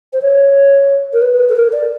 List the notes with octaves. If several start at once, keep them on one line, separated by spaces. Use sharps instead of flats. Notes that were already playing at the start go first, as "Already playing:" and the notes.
C5
C#5
A#4
B4
A4
A#4
D5